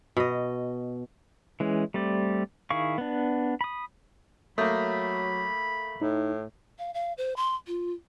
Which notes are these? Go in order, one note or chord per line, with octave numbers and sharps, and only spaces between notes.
B2 D#5
E3 G#3 C#4
G3 A3 C4 D5
D#3 E4 G#4 F5 C#6
B3 D4
B5 D#6
F#3 A3 A#3 B5 D#6 G6
A2 D#4
F5
F5
C5
C6
F4